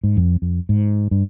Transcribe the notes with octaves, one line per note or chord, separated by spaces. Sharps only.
G#2
F2
F2
G#2
G2